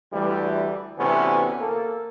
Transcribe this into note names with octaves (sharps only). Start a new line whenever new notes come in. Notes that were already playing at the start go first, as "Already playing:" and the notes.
D2 E3 G3
D2 C3 E3 B3 C#4
A#3 A4